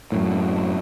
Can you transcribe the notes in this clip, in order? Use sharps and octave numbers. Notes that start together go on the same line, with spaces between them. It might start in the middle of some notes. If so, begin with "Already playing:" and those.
F#2 A2